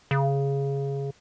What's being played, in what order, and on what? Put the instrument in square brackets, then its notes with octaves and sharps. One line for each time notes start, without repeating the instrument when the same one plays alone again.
[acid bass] C#3